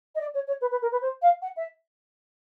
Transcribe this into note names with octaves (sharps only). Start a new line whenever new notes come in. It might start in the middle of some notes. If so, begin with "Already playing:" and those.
D#5
D5
C#5
C#5
B4
B4
A#4
B4
C5
F5
F#5
E5